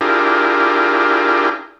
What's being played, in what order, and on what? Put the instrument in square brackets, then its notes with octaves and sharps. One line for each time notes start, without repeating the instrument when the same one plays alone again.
[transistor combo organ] D4 E4 F4 G4 G#4 A#4